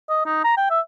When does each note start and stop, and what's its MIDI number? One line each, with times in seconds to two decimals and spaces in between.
0.10 0.21 75
0.25 0.41 63
0.44 0.53 82
0.58 0.69 79
0.70 0.80 76